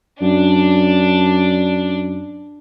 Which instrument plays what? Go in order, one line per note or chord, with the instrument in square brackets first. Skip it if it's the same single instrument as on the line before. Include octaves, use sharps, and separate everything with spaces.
[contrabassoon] F#2 [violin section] D4